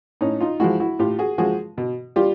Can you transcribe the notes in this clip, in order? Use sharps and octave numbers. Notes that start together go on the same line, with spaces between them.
A2 C#4 D#4
D#4 F4
F3 G#3 E4 F#4
E4 F#4
A2 F4 G4
F#4 G#4
F3 G#3 F#4 G#4
B2
G3 F4 G4